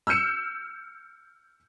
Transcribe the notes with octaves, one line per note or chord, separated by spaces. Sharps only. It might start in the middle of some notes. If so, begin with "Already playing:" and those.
E6 F6 G6 C#7 E7